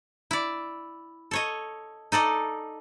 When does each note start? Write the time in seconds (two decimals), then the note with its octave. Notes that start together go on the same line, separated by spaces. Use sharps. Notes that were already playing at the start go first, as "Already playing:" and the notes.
0.31 E4 D5
1.31 A4 C#5 D#5
2.12 D#4 A4 D5 D#5